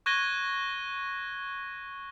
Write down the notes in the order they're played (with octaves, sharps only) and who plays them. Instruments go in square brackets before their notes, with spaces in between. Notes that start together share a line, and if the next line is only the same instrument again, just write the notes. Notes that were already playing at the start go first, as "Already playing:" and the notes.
[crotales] C#6 F#6 G#6 A#6 D#7 G7